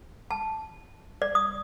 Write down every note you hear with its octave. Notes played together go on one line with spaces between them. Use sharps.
A5
D5
D#6